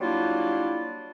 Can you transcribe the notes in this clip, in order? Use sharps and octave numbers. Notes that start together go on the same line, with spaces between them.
F#3 G3 A#3 D4 E4 F4